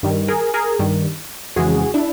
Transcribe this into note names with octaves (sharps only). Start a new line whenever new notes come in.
G2 D#3 G3
G#4 A#4
G#4 A#4
G2 D#3 G3
F2 C#3 E3 G#3 F#4 G#4
D4 E4